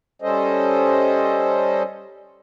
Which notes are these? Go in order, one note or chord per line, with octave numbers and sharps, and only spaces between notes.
G3 C#4 A4 C5 D#5